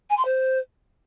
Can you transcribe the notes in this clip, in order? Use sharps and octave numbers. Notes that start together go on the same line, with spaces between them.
G#5
C6
C5